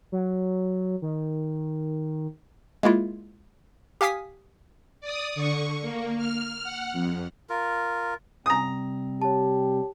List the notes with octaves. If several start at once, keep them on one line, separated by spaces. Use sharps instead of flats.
F#3
D#3
G#3 A#3 E4 F4
G4 F5 G#5 D#6 B6
D5 D#6
D3 C#6
A#3
F6
F#5
F2
F4 A#4
C3 G3 C4 A#5 D#6
G4 C#5 A5